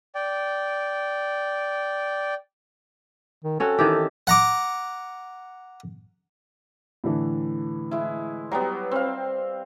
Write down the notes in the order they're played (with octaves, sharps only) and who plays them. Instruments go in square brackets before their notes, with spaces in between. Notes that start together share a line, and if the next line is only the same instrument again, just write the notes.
[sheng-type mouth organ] D5 G5
[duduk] D#3
[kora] C4 C#4 F#4 [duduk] A4
[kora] D#3 E3 G4
[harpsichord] F#5 A#5 D6
[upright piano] A2 D3 E3
[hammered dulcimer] G#3 E4
[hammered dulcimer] F#3 G3 B3 [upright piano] G5 A#5
[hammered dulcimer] C4 F5